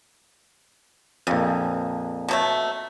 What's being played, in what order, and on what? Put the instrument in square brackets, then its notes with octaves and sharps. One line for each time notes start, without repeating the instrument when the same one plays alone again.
[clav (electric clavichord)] A#1 F2 [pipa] C#3
[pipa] B2 F#3 A3